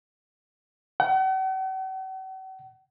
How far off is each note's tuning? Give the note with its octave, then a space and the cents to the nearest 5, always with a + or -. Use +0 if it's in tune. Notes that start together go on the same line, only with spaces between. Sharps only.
F#5 +45